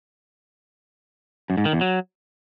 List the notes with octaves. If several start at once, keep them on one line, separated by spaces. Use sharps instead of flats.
F#2
G#2
D#3
E2
F#3